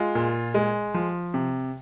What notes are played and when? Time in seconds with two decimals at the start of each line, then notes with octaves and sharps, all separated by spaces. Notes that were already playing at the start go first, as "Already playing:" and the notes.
Already playing: G#3 F4
0.15 A#2
0.54 G#3
0.94 F3
1.34 C3